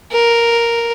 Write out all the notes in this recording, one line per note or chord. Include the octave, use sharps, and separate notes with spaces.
A#4